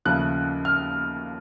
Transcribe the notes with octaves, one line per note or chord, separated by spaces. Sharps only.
D#2 C#3 F3 A3 F#6
F6